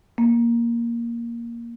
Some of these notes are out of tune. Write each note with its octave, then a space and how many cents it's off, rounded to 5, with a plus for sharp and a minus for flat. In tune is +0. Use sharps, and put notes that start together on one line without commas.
A#3 +5